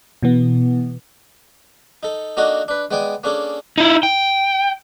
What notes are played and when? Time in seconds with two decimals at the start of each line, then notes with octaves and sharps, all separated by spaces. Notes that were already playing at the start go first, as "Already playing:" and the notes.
0.23 B2 E3 B3
2.03 D#4 A4
2.37 A#3 D4 D#4 F#4 A4 D#5
2.68 D4 B4
2.91 G#3 B3 D5 G5 G#5
3.24 A#3 C#4 D4 G#4 A4
3.78 D#4 E4
4.03 G5